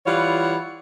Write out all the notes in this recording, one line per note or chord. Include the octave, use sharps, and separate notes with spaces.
E3 G3 F4 C#5 F#5